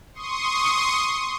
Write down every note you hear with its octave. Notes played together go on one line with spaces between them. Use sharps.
C6 C#6 D#6